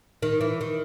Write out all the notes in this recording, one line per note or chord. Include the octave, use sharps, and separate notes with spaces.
D#3
E3
D#3